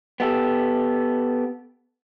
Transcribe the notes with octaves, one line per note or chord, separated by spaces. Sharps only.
B3 G4 A4